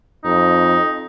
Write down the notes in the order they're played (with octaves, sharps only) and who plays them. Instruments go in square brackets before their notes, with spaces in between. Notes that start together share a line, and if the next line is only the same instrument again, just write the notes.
[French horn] F2 [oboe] D#4